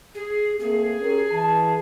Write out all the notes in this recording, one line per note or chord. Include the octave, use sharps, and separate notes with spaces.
G#4
A3 A#3 C4 G#4
C#4 G4 A#4
E3 A5